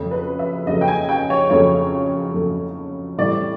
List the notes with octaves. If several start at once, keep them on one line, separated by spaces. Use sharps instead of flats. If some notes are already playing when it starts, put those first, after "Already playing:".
Already playing: F2 C#3 F#3 A3
B4
E5
F2 C#3 F#3 A3 D#5
G5
G#5
G5
C#5
F2 C#3 F#3 A3 C#5
F2 C#3 F#3 A3
A2 E3 G3 C4 E4 D5